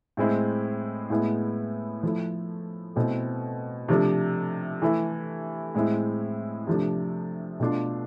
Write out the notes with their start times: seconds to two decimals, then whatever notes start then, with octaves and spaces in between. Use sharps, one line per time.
0.17 A2 G#3 C4 E4
1.10 A2 G#3 B3 E4
2.03 F3 A3 E4
2.96 B2 A3 C4 E4
3.88 C3 F3 A3 D4
4.82 E3 A3 E4
5.75 A2 G#3 C4 E4
6.67 C3 F3 A3 D4
7.60 B2 A3 D4 F4